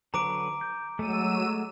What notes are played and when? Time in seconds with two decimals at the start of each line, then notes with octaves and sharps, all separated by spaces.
0.14 D3 F#3 B4 A#5 D6 D7
0.61 G6
0.99 F#3 G#3 A3 A4 E6 D#7